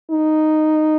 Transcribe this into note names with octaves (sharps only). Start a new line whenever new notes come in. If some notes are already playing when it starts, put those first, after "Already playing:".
D#4